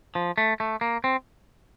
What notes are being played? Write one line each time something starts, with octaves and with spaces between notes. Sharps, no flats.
F3
A3
A3
A#3
C4